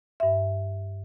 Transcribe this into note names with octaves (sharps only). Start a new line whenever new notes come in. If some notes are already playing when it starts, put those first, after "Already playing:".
G2 E5